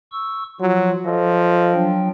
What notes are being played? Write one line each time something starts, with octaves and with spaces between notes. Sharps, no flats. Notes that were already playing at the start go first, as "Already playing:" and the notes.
C#6 E6
F3 F#3 F4
F3 A4 D#5
F#3 D4 G5